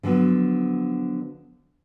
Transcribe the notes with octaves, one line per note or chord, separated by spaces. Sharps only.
D3 F3 F#3 B3